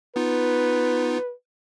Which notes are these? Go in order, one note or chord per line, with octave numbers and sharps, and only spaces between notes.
B3 D#4 F4 B4